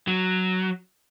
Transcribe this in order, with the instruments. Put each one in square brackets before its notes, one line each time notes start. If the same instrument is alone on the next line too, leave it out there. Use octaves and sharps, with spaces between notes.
[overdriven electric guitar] F#3